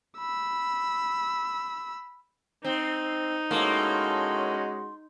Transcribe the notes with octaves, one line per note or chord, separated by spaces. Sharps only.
B5 E6
C4 D#4
A2 G#3 A#3 C#4 F#4 C6